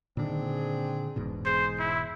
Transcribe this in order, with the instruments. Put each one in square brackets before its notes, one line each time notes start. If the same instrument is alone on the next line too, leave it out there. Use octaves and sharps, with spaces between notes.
[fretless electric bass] A#2 D3 D#3 [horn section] C4 D4 G#4
[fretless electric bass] E1 G#2 B2
[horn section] D#4 G#4 [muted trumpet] C5
[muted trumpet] E4